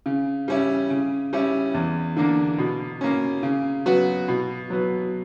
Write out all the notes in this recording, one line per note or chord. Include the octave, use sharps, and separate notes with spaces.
C#3
G3 C#4 E4
C#3
G3 C#4 E4
E2
D3 A#3 D4
B2
A#3 C#4
C#3
F#3 B3 F#4
B2
F#3 B3